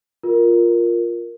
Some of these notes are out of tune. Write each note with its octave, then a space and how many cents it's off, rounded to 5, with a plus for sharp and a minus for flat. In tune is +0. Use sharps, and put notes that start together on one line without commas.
F4 +0 A#4 +0